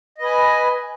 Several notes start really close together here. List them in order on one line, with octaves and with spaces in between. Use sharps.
D#5 B4 G#5